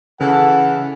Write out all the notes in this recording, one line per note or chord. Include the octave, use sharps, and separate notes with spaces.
C#3 E3 A4 F#5